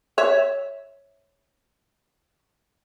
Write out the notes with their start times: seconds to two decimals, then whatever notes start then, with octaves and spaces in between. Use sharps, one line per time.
0.18 C#5 E5